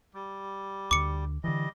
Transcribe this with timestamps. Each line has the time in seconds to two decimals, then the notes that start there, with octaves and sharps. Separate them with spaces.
0.14 G3
0.91 D2 D3 D6 C#7
1.44 D3 E3 G3 D#5